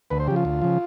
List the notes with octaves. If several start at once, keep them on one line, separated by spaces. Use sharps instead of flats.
D2 B4
C5
C#3 F3 G4
F4
D2
C#3 F3